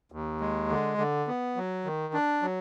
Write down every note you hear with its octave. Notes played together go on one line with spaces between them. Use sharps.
D#2
G#3
D3
D3
B3
F#3
D#3
D4
F#3